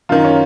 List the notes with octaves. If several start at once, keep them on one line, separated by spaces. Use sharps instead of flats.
F#2 D#3 F4
C#4